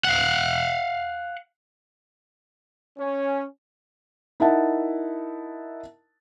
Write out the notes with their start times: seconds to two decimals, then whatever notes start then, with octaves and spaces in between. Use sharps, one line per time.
0.05 F5 F#5
2.98 C#4
4.40 D#4 E4 A#4 E5 F#5 A5